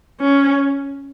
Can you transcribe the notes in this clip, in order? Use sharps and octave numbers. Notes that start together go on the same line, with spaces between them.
C#4